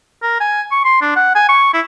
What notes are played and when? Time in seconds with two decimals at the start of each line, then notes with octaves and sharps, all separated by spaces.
0.22 A#4
0.40 G#5
0.72 C#6
0.85 C6
1.02 D4
1.16 F#5
1.35 G#5
1.49 C#6
1.74 E4